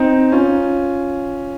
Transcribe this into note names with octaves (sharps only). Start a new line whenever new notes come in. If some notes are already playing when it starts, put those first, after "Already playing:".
Already playing: C4 D#4
C#4 F4